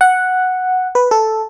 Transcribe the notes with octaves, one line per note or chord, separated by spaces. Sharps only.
F#5
B4
A4